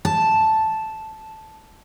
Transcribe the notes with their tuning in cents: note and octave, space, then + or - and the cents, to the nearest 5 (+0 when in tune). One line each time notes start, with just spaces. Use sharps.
A5 -5